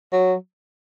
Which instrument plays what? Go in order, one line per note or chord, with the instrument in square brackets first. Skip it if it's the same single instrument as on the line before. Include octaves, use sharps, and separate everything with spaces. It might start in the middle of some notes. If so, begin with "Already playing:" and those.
[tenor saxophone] F#3